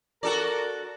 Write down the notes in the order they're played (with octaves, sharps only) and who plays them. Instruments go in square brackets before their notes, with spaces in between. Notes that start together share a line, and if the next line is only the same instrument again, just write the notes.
[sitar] F#4 A4 D5 [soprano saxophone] A#4